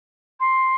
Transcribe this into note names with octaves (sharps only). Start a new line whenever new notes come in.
C6